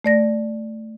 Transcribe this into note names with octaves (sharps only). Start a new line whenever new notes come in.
A3 D5 A#6